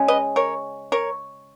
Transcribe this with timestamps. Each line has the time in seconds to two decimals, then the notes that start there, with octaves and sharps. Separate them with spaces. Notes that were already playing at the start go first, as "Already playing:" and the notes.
Already playing: C#3 G#3 C#4
0.08 B4 D#5
0.36 A#4 C#5
0.92 A#4 C#5